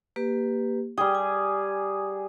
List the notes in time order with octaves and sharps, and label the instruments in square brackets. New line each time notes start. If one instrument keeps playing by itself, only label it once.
[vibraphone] A#3 G4 B4
[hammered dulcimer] G3 G#4 [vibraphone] G5
[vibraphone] G#5